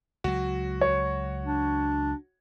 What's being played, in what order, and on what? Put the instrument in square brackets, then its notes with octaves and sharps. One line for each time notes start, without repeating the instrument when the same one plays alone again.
[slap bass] C#2 F#3 [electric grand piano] F#4
[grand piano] C#5
[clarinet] D4